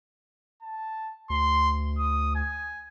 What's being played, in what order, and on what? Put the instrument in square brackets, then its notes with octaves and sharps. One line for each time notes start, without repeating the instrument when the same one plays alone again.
[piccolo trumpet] A5
[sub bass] D2 [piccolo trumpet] C6
[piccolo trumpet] D#6
G#5